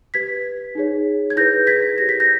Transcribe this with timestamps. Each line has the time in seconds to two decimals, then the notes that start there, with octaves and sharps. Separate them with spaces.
0.14 G4 B4 G#6 B6
0.75 D#4 G#4 C#5
1.30 G#6
1.36 E4 G#4 B4 G6 A#6
1.67 G#6 B6
1.98 E4 G4 A#4 C#5 A#6
2.09 B6
2.20 G6 A#6